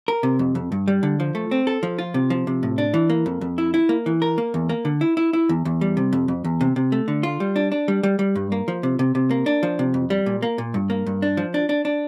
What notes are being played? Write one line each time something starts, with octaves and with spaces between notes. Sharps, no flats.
A#4
C3
F2
F2
G2
G3
D3
F3
A3
C4
A4
F3
F4
C3
F3
C3
A2
D4
E3
A#3
F2
F2
E4
E4
A#3
E3
A#4
A#3
E2
A#3
D3
E4
E4
E4
E2
E2
G3
C3
F2
F2
E2
C3
C3
A3
D3
F4
G3
D4
D4
G3
G3
G3
G2
A#3
F3
C3
C3
C3
A#3
D4
F3
C3
F2
G3
A#2
A#3
A#2
G2
A#3
G2
D4
F3
D4
D4
D4